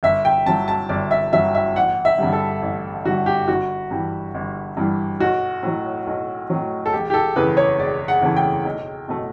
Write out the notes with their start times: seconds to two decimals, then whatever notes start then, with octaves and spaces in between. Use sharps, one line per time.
0.03 G1 E5
0.25 G5
0.46 G2 F#3 A5
0.68 A5
0.89 G1 D5
1.11 E5
1.33 G2 F#3 E5
1.55 E5
1.76 A1 F#5
2.05 E5
2.18 G2 D3 G3
2.33 A4
2.62 A1
3.05 G2 D3 G3 F#4
3.26 G4
3.48 G1 F#4
3.91 G2 E3 G3
4.35 G1
4.77 G2 E3 G3
5.20 B1 F#4
5.63 A2 F#3
6.07 B1
6.50 A2 F#3
6.86 A4
6.93 E1 G4
7.10 G4
7.14 A4
7.36 E2 C#3 E3 A3 B4
7.57 C#5
7.79 E1 D5
8.08 F#5
8.21 E2 C#3 E3 A3
8.36 G5
8.65 B1
9.08 B2 A3